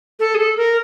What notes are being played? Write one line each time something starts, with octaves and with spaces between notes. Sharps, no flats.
A4
G#4
A4
A#4